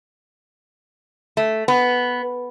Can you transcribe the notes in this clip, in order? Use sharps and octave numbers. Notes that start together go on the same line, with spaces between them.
A3
B3